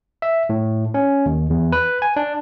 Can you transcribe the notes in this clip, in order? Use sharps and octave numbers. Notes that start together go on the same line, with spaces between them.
E5
A2
C#4
D#2
E2
B4
G#5
D4